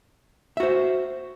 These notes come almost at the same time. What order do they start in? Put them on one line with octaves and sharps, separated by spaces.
E5 F#4 C5